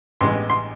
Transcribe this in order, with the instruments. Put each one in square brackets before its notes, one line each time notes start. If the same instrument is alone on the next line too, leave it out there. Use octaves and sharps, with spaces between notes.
[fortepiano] A1 G2 E3 G#3 B3 C6
C6